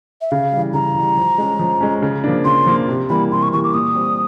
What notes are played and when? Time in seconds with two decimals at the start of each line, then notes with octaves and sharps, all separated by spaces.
0.21 E5
0.31 C#3 F5
0.52 G3
0.57 E3
0.74 C#3 A#5
0.95 E3 G3
1.17 F3
1.38 G#3 C#4
1.59 F3
1.81 G#3 C#4
2.02 C#3
2.24 F3 A#3 D4
2.45 C#3 C6
2.66 F3 A#3 D4
2.88 C3
3.10 E3 G3 A#3 B5
3.31 C3 C6
3.42 C#6
3.53 E3 G3 A#3 C#6
3.64 D6
3.74 A#2 D#6
3.95 G3 C4